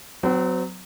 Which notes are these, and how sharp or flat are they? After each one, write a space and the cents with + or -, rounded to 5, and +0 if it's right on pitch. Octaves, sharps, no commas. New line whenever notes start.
F#3 +0 C4 -40